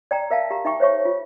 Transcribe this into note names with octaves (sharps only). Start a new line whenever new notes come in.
D5 G5 A#5
A#4 E5 F5 A5
G4 A#5
D#4 E5 G5 C#6
C5 C#5 E5 C#6
F4